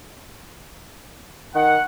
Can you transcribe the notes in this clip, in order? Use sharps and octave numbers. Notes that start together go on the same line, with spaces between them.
D#3 F#5